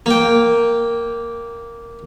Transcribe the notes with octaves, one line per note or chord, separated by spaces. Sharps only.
A#3 G5